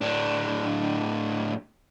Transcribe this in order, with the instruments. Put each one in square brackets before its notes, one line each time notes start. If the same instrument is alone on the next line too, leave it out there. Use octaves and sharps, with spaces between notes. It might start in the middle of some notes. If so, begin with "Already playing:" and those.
[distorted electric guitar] A2 D4